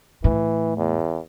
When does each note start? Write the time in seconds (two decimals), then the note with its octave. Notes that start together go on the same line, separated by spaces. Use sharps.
0.24 A2 E3
0.77 E2